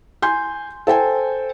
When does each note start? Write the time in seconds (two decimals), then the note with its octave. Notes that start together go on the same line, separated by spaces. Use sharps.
0.22 G#5 C6 G6
0.87 A4 C5 G5 G#5